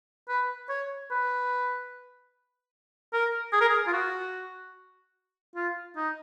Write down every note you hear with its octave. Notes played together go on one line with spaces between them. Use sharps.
B4
C#5
B4
A#4
G#4
A#4
G#4
F4
F#4
F4
D#4